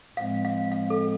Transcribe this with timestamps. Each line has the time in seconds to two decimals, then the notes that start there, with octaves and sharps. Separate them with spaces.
0.16 A2 F3 G#3 C4 F5
0.45 F5
0.72 F5
0.90 A4